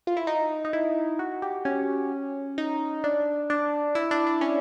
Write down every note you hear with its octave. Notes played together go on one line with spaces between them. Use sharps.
F4
E4
D#4
D#4
E4
F#4
G4
C#4
D#4
D4
D4
E4
D4
D4
C#4